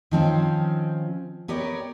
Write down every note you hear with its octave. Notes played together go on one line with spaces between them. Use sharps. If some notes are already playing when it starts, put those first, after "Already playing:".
D#3 F3 C4 C#4
B3 G4 A#4 C#5 D5